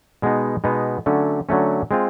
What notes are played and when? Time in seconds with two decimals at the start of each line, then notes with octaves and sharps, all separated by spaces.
0.22 B2 G#3 B3 D#4
0.64 B2 G#3 B3 D#4
1.06 D3 F#3 A3 C#4
1.49 D3 F#3 A3 C#4
1.91 G#3 C4 F4